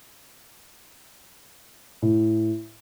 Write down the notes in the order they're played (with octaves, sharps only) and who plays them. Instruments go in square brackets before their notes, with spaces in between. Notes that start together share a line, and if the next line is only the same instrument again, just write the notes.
[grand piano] A2